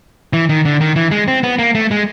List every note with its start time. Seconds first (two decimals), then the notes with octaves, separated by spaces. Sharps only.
0.33 E3
0.49 D#3
0.65 D3
0.81 D#3
0.96 E3
1.11 G#3
1.28 C4
1.43 B3
1.59 A#3
1.75 A3
1.91 G#3